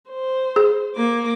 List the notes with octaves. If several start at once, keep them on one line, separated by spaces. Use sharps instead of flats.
C5
G#4
A#3 D6